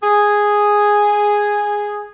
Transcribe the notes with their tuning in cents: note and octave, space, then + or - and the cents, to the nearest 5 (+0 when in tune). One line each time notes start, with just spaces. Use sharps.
G#4 -5